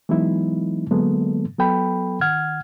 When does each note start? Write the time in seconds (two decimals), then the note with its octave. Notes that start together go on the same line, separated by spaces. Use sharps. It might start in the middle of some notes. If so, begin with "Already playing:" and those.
0.09 E3 F#3 G#3 B3 D#4 E4
0.91 D3 F#3 G#3 A#3 B3 A4
1.59 F#3 B3 A4 G5 B5
2.21 D#3 F#5 F6 G#6